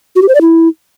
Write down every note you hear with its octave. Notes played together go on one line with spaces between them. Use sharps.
F#4
G4
C5
D5
E4